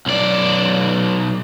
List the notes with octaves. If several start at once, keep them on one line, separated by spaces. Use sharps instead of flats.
B1 D5